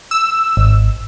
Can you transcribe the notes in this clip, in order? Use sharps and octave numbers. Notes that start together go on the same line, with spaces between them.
E6
G#1